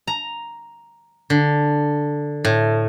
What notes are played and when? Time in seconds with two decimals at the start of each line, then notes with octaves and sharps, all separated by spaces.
0.07 A#5
1.30 D3
2.45 A2